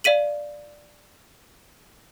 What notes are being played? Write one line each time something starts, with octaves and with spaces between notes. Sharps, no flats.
D5 F5 B6 D#7 F#7